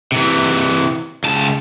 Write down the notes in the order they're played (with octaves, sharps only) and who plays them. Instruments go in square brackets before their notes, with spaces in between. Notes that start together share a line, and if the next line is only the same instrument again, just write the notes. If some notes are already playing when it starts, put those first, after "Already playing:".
[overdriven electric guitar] C3 E3
C#2 A5